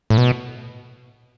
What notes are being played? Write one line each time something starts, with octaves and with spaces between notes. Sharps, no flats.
A2
B2